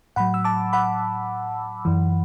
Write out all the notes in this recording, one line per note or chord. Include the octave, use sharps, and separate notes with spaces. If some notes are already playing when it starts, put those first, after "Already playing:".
A2 F#3 F#5 B5
E6
A5 D6
F#5 B5
F#2 E3